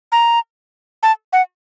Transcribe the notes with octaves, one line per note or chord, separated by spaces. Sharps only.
A#5
A5
F#5